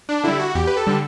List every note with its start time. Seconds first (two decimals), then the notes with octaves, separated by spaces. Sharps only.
0.09 D4
0.24 D3 G3 E4
0.39 F#4
0.55 E2 G4
0.67 B4
0.77 A4
0.87 D3 G3